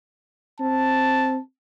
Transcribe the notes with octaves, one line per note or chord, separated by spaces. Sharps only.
C4 A5